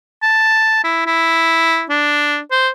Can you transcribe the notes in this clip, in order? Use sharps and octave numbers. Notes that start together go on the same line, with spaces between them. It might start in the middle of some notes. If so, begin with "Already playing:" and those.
A5
E4
E4
D4
C5